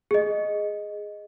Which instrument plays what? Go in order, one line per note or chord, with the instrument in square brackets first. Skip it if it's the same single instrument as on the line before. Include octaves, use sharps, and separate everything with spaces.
[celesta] G#4 D#5